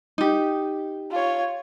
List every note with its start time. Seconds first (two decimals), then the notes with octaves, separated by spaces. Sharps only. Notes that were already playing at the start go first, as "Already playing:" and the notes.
0.18 D#4 G4
1.11 F4 C#5